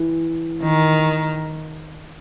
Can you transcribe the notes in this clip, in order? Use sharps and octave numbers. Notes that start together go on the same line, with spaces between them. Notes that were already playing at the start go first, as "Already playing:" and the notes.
Already playing: E3
D#3